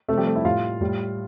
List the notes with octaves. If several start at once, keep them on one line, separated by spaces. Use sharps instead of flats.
C3 F3 A3 A4
G3 G4
A3 A4
E4 E5
A2 G3 F4 F5
A2 G3